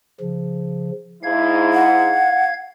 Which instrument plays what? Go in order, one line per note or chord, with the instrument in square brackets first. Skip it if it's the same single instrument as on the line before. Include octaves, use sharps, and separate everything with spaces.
[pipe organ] C#3 F3
[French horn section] G#2 E4 [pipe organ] F5 G#6
[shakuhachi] F#5